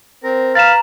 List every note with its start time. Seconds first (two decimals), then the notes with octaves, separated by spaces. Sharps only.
0.24 C4 A#4
0.55 B4 F5 A#5 F#6 A6 E7